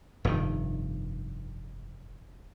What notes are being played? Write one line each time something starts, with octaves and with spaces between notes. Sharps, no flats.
F1 G2 D#3